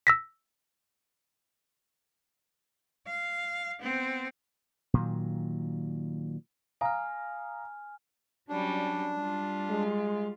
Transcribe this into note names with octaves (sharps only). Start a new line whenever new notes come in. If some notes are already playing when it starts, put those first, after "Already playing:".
E6 A#6 B6
F5
B3 C4
A#2 D#3 F#3
F5 G#5 A#5 D#6 F6
F#3 G3 C#4 D4
G3 F4
G#3